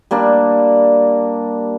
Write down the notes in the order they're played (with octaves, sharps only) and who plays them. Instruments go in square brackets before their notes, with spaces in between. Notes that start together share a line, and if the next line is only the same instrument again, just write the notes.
[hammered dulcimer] G3 A#3 D4